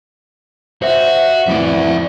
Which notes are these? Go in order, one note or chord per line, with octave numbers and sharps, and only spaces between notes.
F#4 C5 E5
F2 A2 E3 D5 E5